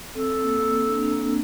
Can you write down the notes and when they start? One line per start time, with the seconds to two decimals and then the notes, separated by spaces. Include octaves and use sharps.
0.15 C4 A4
0.44 A#3
0.62 A#3
0.73 C4
0.87 D4
1.03 D4
1.12 A#3
1.16 C4